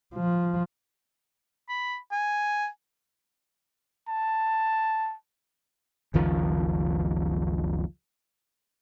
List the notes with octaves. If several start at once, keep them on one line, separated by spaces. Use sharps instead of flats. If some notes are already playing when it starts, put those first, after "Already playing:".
F3
B5
G#5
A5
F#1 C#2 D#3 F3